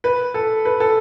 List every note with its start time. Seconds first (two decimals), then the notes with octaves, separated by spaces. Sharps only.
0.04 B4
0.34 A4
0.65 B4
0.80 A4